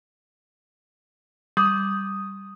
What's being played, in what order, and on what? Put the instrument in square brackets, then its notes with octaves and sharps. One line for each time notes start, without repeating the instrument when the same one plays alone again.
[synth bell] G3 [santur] D#6